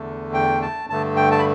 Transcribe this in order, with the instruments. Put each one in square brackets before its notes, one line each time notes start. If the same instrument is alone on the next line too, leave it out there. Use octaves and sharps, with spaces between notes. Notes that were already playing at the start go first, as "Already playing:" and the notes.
Already playing: [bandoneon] E2 D3 A3
G5
A5
G2 D3 A3 A5
G5
A5
B5